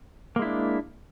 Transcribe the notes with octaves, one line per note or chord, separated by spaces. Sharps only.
G#3 A#3 D4 E4